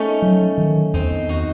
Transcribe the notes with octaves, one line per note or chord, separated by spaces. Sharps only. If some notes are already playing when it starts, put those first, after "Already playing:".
Already playing: A3 C#4 D#4
F#3
D#3
E2 C4 D#4
D#4 F#4